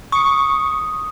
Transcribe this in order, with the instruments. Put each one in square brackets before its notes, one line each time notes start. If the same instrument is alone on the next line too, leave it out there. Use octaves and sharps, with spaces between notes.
[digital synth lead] C#6 [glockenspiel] D#6